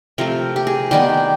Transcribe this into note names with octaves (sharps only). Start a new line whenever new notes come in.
C3 F3 A3 A#4
G4
G#4
D#3 G3 B3 G4